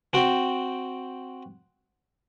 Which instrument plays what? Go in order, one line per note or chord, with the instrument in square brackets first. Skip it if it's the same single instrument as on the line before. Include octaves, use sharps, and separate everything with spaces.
[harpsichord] C4 F#4 G5